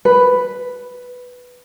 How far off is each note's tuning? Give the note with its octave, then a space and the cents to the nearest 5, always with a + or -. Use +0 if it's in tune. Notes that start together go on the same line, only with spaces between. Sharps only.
B4 +5